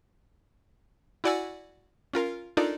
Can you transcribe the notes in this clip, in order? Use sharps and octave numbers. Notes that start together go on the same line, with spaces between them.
E4 F#4 D5 F#5 G#5 E6
C#4 F4 A#4 F5
D4 D#4 F4 A4 A#4 D5